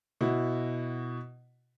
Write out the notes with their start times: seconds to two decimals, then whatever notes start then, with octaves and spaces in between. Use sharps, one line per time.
0.21 B2 E4 F#4